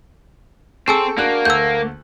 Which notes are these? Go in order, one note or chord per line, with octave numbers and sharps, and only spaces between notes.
C4 G#4 A4 G#5 C#6 E6
A#3 D4 F#4 F#6
D2 A3 F#5 E6 G6